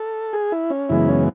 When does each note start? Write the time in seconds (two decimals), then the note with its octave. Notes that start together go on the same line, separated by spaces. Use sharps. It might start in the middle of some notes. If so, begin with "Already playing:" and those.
Already playing: A4
0.33 G#4
0.52 E4
0.70 C#4
0.89 F#2 C#3 E3 G#3 B3 E4
1.09 C#4